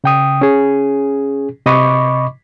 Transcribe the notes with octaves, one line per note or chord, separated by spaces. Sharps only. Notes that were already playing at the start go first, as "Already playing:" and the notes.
C#3 G5 D#6
C#4 G#4
C3 D#5 B5 C#6 D6